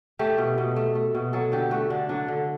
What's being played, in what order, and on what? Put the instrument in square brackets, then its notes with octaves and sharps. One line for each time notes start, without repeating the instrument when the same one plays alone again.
[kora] A3 G4
B2
B2
A3
A3
B2
F#3 A4
D3 G4
A3 F#4
D3 D4
F#3 D4
D3